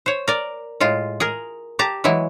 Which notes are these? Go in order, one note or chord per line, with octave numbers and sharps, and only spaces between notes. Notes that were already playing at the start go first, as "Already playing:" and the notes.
C5 C#5
A#4 D5
A2 G#3 F4
G#4 A#4
G4 A5 A#5
E3 F#3 G#3 E4